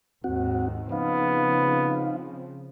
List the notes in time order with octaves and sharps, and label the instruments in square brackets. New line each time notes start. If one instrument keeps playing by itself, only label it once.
[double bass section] D#2 G#2 D#3 [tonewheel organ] C4 F#4 F#5
[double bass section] C#3 F3 C4 [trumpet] B3 [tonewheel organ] D#4 F5